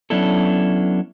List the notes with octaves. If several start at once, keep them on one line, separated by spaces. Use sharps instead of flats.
F#3 B3 C#4 D4 E4 A4